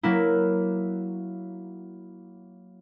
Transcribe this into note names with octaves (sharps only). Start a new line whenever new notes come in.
F#3 A#3 E4